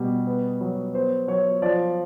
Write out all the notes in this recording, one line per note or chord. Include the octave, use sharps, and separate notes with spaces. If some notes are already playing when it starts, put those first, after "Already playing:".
Already playing: B2 G3
B3
F#3
B3 C5
F#3 C#5
F3 D5